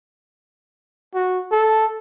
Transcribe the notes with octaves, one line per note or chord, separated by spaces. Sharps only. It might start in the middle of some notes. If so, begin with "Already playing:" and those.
F#4
A4